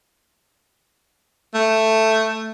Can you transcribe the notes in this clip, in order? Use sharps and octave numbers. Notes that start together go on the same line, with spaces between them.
A3